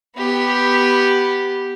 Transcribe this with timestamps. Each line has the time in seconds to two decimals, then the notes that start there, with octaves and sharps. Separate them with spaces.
0.17 B3 G4